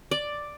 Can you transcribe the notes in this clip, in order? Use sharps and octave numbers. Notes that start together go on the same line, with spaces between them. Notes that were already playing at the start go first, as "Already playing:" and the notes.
D5